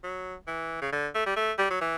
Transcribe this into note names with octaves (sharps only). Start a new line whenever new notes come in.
F#3
E3
C#3
D3
A3
G3
A3
G3
F#3
E3